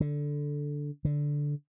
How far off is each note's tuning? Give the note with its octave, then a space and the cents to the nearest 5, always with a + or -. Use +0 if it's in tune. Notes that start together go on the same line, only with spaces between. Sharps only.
D3 -5
D3 -5